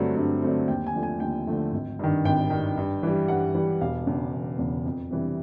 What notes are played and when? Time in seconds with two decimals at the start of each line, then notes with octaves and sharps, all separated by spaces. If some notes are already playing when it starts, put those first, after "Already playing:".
Already playing: G2 D3 F#3 A3 C4
0.16 G2
0.42 D3 F#3 A3 C4
0.68 D#2 G5
0.87 G#5
0.95 D3 F3 A3
1.03 G#5
1.20 D#2 G5
1.47 D3 F3 A3
1.72 G#1
1.99 G2 D#3
2.25 G#1 G5
2.50 G2 D#3
2.77 G2
3.03 E3 G3
3.28 G2 F#5
3.54 E3 G3
3.81 E1 F5
4.07 E2 C#3
4.34 E1
4.59 E2 C#3
4.86 F2
5.11 C3 E3 G3